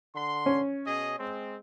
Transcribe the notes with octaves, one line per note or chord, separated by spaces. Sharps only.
D3 C6
C#4
B2 G#4 D#5
G#3 C4